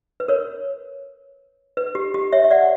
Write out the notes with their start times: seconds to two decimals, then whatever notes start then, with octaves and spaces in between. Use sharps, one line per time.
0.20 B4
0.28 A#4 C#5
1.77 B4
1.95 G4
2.14 G4
2.32 C#5 E5
2.44 E5
2.51 D5 F#5